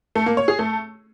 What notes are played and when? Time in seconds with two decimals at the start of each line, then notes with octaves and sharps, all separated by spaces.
0.15 A3
0.26 A#3
0.37 C#5
0.48 G#4
0.59 A3